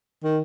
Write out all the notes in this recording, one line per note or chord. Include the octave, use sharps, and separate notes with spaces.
D#3